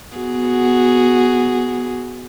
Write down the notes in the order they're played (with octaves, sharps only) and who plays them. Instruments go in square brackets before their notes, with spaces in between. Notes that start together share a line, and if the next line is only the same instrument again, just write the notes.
[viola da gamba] B3 F#4 G#4